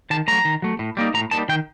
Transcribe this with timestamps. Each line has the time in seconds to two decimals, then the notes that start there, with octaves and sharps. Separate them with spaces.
0.10 D#3 A5
0.28 F#3 A3 A#5
0.45 D#3
0.62 F#3 A3
0.79 A2
0.97 G3 A#3 D#4
1.14 A2 A#5
1.31 G3 A#3 D#4 A5
1.49 D#3 G5